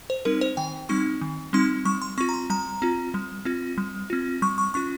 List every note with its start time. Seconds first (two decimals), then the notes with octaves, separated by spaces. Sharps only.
0.10 C5
0.25 G3 C4 D#4 A#4
0.41 C5
0.57 D#3 G5
0.89 G3 C4 D#4 C#6
1.21 D#3
1.53 G3 C4 D#4 C6
1.85 G3 C#6
2.02 C6
2.18 C4 C#6
2.21 F4
2.29 A#5
2.34 C6
2.50 G3 A#5
2.82 C4 F4
3.14 G3
3.45 C4 F4
3.78 G3
4.10 C4 F4
4.42 G3 C#6
4.58 C#6
4.74 C#4 F4 C#6